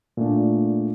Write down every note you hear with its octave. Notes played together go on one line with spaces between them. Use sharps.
A#2 A3 D4